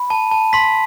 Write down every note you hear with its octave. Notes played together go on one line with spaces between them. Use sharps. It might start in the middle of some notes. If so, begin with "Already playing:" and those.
Already playing: B5
A5
A5
C6 B6